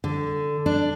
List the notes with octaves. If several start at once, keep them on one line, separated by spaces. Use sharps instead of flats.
D3
D4